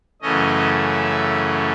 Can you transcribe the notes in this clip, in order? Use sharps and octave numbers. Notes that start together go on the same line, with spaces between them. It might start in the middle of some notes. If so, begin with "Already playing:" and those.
F#2 C#3 E3 A3 C#4 D#5
E5